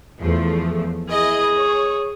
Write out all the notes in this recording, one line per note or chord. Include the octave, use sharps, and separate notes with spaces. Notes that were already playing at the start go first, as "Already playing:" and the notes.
E2 F3 A3
E4 G#4 D#5
C#5